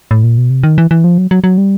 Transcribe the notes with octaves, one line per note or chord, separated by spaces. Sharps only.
A2
A#2
B2
C3
D#3
E3
E3
F3
F#3
F#3
F#3
G3